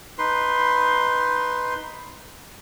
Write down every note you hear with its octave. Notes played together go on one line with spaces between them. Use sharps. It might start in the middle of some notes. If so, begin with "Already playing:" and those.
D#4 B4 C6